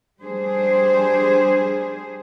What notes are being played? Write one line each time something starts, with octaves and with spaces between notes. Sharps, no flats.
G3 D4 G#4 C5